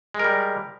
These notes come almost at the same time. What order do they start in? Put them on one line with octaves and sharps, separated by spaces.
G#3 A#4 G3